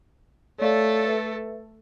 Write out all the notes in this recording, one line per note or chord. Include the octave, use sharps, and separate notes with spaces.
A3 A4 C#5 D5 F5
B4 E5